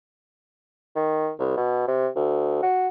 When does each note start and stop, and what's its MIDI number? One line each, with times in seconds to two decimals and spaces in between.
0.96 1.30 51
1.39 1.56 36
1.57 1.84 47
1.87 2.08 48
2.16 2.62 38
2.63 2.88 66